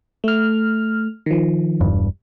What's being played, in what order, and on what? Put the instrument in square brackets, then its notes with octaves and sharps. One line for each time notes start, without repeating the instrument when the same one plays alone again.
[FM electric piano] A3 F6
D#3 F3
[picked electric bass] E1 G2